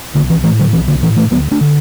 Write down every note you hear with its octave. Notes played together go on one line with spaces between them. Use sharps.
B1 D3
E3
A2 E3 A3
D3 F#3
B1 E3
D3
A2 E3
E3 A3
D2 F#3 B3
A3 D4
D3